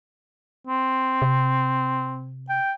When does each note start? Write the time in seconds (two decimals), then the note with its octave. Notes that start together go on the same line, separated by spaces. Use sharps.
0.67 C4
1.22 C3
2.49 G5